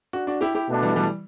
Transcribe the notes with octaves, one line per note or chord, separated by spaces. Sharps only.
D4 F#4
D4 F#4
E4 G4
E4 G4
B2 A3 D4
E3 G3
E3 G3